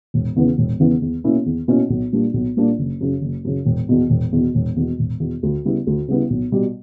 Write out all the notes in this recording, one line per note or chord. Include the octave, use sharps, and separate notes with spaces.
E1
E2 C#3 E3 B3
E1
E2 C#3 E3 B3
E2
B2 A#3 C#4 E4
E2
B2 A#3 C#4 E4
B1
A#2 G3 A#3 D4
B1
A#2 G3 A#3 D4
F#1
F#2 C#3
F#1
F#2 C#3
E1
E2 B2
E1
E2 B2
E1
E2 B2
E1
E2 B2
D2
C#3 G3 B3 E4
D2
C#3 G3 B3 E4
B1
B2 G3